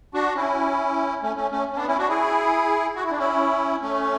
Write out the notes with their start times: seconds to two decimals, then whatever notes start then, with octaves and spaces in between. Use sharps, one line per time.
0.14 D4 F#4
0.36 C#4 E4
1.23 A3 C#4
1.36 A3 C#4
1.51 A3 C#4
1.72 C#4
1.76 B3 D4
1.87 C#4 E4
1.97 D4 F#4
2.09 E4 G#4
2.96 F#4
3.03 E4
3.11 D4
3.18 C#4 E4
3.81 A3 C#4